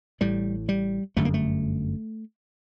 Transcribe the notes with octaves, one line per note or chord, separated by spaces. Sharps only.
A1 A2 G3
G3
G1 F#2 D3 A3
A#3
A3